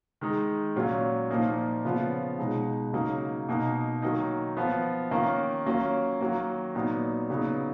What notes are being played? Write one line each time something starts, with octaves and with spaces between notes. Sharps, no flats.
D#3 G#3 D#4
A#2 F#3 C#4 F4
A#2 F3 A#3 D#4
C#3 F3 B3 F4
B2 G#3 D#4
C#3 F#3 A#3 D#4
B2 A#3 D#4
D#3 F#3 A#3 D#4
F3 B3 F4
D#3 A#3 C#4 F4
F#3 A#3 C#4 F4
D#3 F#3 A#3
A#2 F#3 B3 D#4
C#3 F#3 B3 D#4